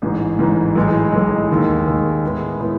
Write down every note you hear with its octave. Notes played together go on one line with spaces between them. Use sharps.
A1 G#2 E3
A1 G#2 E3
B1 A2 E3 G#3
B1 A2 E3 G#3
D#2 D#3 G#3
D#2 D#3 G#3
A2 G#3 B3 E4
A2 G#3 B3 E4